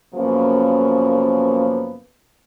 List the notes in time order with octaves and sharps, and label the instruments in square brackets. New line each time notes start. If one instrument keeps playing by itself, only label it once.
[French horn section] F#2 C#3 F3 A#3 B3